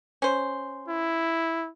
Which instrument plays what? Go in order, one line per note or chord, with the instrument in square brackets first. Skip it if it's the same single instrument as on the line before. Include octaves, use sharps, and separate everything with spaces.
[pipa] C#4 C5
[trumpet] E4